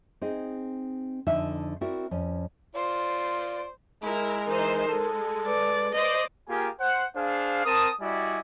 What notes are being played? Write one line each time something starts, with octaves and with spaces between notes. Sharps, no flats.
C4 D#4 G#4 D#5
F2 D3 D#4 A4 E5 G#5
C4 E4 F#4 A#4 D5
F2 C#4
F4 C5 D5 C6
G#3 E4 A#4
E3 D#4 A#4 C5
G#3 A4
B4 D5
C5 D5 D#5
A#3 F4 G4 G#4 A#4 G#5
C5 F#5
D4 G#4 C5 F5
C4 A#4 A5 D#6
G3 E4 F#4 D5 D#5 G#5